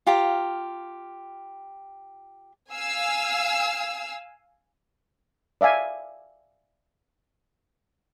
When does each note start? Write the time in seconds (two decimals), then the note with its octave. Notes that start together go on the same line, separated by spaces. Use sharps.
0.07 F4 G4 F5 A#5
2.72 F5 G#5 E6
5.61 D5 E5 F5 G#5